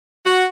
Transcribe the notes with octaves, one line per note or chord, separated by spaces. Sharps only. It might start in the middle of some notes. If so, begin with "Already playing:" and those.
F#4